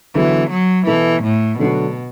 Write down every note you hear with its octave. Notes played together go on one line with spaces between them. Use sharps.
D3 E3 F#3 B3 F#4
F#3
B2 E3 B3 E4 A4
A2
B2 D3 F#3 A3 D4 F#4